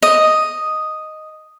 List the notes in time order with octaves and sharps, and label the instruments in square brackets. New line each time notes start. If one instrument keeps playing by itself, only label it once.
[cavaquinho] D#5